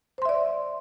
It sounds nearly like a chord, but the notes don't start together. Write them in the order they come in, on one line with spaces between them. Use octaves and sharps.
C5 C6 E5 D5